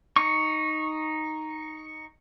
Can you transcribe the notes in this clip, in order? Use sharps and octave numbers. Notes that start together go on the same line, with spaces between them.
D#4 C#6